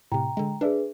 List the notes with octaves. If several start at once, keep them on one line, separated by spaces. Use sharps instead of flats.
A2 C3 G5 A#5
D3 G#3
D4 G#4 B4 D5 E5